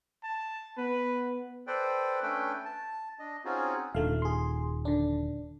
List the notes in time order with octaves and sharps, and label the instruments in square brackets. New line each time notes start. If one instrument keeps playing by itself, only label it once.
[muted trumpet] A5
[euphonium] B3 [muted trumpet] B4
[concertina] A4 B4 C5 D5 G5
A3 C#4 D4 A4 B4 G5
A5
D4 D#5
C4 C#4 D#4 F4 F#4 G#4
[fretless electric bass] D#1 [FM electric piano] D3 A3 F5
[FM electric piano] G#4 C6
D3 D4